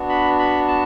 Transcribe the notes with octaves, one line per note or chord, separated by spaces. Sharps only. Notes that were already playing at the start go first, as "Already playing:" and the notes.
Already playing: B3 D4 F#4
B5
B5
A5